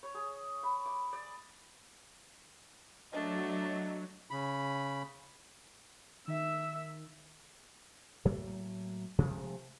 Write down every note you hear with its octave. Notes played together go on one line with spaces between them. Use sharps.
C#5
G#4
B5
D6
D5
F#3 A3 D4 D#5
C#3 B5
D#3 E5 E6
A2 F#3 A3 A#3
C3 F3 G#3 A3